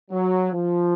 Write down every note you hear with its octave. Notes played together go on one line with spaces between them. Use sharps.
F#3
F3